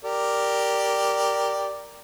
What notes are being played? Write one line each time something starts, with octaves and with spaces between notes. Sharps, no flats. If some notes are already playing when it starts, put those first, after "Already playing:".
G4 A#4 D5